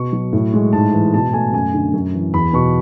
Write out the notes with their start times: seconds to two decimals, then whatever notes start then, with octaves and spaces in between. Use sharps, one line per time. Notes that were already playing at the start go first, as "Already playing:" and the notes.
Already playing: B2 C#6
0.13 F#3
0.33 A2
0.54 G#3
0.73 G#2 A5
0.93 E3
1.14 B2 A5
1.33 A3 G#5
1.53 F#2 G#5
1.74 D3
1.93 F#2
2.14 E3
2.33 E2 B5
2.53 B2 C#6